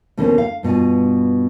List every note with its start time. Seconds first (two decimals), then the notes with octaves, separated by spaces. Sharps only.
0.17 D2 B2 E3 A#3 C#4 C5
0.38 F5
0.63 G2 B2 F4 G#5